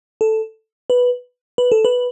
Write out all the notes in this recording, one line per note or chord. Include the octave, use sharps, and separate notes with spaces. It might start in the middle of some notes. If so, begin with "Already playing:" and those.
A4
B4
B4
A4
B4